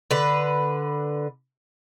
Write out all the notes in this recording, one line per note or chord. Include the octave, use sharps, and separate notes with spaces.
D3 B4